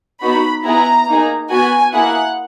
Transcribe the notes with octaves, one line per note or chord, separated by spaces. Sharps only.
B3 D#4 F#4 B5
B3 E4 G#4 A#5
A#3 D#4 G#4
B3 F#4 G#5
A#3 E4 G#4 F#5